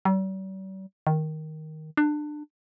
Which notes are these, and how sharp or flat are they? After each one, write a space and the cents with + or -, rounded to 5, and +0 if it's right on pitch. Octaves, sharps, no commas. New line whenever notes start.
G3 -45
D#3 +5
D4 +25